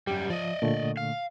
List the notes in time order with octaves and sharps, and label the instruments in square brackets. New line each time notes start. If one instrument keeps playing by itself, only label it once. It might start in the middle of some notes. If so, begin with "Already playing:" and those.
[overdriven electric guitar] F#2 G3 [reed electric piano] G4
[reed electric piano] F3 [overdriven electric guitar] D5 D#5
[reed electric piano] A#2 D3 A3
[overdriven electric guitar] F5